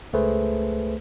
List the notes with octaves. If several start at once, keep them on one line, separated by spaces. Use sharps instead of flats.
C#2 A3 G#4 B4 C5